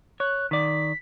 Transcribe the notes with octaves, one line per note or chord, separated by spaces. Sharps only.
C#5 F#6
D#3 D5 B6